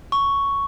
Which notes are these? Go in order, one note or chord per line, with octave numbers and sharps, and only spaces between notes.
C#6